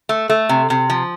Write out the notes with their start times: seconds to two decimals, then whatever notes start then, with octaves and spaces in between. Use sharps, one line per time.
0.09 A3
0.29 A3
0.49 C3
0.70 C3
0.90 F3